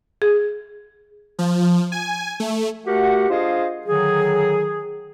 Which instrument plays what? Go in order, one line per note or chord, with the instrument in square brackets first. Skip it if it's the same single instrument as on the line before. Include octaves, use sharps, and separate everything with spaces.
[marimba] G#4
[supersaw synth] F3
G#5
A3
[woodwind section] A3 F#4 G4 A#4 F#5
D4 F4 G#4 C5 D#5 F5
D3 D#3 F#3 G#4